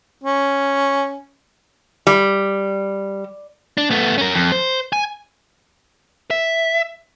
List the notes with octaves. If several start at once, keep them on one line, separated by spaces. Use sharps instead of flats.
C#4
G3
D4
A3 B3
C#4 A#4
F2
C5
G#5
E5